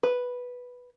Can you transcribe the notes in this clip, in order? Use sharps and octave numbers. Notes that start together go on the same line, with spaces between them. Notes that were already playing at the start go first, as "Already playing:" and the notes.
B4